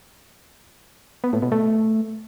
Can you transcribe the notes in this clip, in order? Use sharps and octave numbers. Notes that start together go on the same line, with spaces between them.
B3
A2
B2
A3